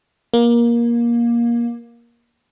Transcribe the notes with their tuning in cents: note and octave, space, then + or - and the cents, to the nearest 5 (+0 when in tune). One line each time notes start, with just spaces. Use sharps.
A#3 +20